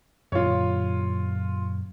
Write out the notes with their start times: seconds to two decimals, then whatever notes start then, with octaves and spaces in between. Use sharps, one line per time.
0.32 F#2 A#2 D3 F4 C#5